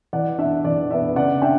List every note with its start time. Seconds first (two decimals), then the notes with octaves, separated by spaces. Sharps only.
0.13 E3 D5 F#5
0.39 B3 D4 E5
0.64 E3 D5
0.91 B3 D4 E5
1.16 C#3 D5 F#5
1.42 D4 E5 G5